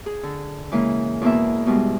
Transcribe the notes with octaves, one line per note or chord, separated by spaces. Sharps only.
G#4
D3
C#3 E3 G#3 A#3
E2 B2 A#3 E5
B2 G3 G#3